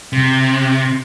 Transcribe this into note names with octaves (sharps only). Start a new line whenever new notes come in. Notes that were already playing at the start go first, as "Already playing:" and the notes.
C3